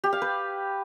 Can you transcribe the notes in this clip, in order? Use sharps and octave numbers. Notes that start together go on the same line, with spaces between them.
G4
F5
B4